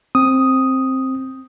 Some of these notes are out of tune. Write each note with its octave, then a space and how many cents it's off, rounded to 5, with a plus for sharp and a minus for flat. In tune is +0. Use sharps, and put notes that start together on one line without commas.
C4 +10 D#6 +0